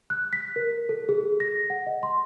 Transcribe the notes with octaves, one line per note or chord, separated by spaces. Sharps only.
F#6
B6
A#4
A4
G#4
A#6
F#5
D#5
C6